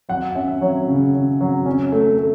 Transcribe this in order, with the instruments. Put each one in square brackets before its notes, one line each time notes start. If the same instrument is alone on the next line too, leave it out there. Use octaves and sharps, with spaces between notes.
[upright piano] F#3 F#5
C#4 E5
F#3 C#5
C#3
C#3
F#3
C#4
A3
A3